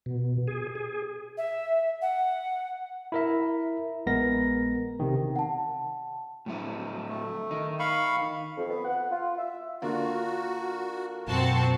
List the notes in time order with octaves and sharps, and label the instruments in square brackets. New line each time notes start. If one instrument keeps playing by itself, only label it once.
[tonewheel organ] B2
G#4
G#4
[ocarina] E5
F#5
[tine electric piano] E4 A#4 E5
A#1 G#3 B3 A#4 A#6
C3 D#3
[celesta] F#5 A5
[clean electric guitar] A2 F#3 E4
[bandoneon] A3
[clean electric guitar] D#3 D#4
[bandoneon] F5 B5 C#6
[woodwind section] F2
B3
F#5
F4
E5
[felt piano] D3 A#3 F4 [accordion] F#4
[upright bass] F#2 B2 [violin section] C4 F#4 A5